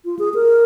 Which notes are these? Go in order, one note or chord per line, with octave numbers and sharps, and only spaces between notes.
F4
G#4
A#4